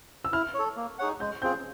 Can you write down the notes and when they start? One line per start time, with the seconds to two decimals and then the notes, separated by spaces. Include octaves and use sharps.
0.25 E6
0.32 E4 F6
0.54 A4 C#5
0.76 A#3
0.99 D#4 G#4 C#5 F#5
1.20 G#3 G6
1.42 C4 F4 G#4 G6